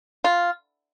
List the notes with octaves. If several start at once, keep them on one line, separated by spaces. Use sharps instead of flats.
F4